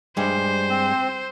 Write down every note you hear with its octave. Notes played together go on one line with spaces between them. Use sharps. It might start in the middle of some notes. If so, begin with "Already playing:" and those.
G2 G3 G#3 C5
C4